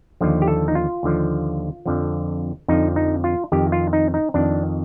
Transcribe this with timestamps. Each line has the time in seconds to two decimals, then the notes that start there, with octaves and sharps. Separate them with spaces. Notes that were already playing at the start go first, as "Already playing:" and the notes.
0.21 D#2 D3 F3
0.42 G4
0.48 A4
0.68 D#4
0.75 F4
1.03 D#2 D3 F3
1.86 F2 D3 F3
2.68 F2 D3 F3 D#4
2.96 D#4
3.24 F4
3.52 F2 D#3 G4
3.72 F4
3.93 D#4
4.14 D#4
4.34 F2 D#3 D4